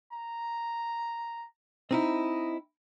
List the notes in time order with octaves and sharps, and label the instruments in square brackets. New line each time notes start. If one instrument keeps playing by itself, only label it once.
[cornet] A#5
[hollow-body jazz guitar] C4 D#4 E4 [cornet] D#5